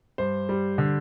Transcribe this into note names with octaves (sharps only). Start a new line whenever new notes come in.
G2 C5
G3
D3